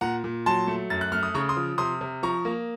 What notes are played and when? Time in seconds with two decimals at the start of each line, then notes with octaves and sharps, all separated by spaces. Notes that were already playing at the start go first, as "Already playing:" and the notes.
0.01 A#2 F#5 A#5
0.24 A#2
0.46 F#3 A5 C6
0.68 A3
0.90 F#2 A6
1.01 F#6
1.12 A3 F6
1.23 D#6
1.34 C#3 A#5 C#6
1.49 C6 D#6
1.57 F3
1.78 C3 C6 D#6
2.01 C3
2.23 F3 A#5 C#6
2.45 A#3